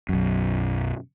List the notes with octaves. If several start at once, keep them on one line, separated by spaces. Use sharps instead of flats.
B1 F#2